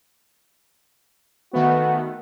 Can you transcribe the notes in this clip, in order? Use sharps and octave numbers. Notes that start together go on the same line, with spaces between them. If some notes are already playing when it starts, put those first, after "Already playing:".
D#3 A3 B3 F#4